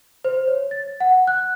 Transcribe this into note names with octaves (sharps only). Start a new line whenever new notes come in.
C5
C#5
A6
F#5
F#6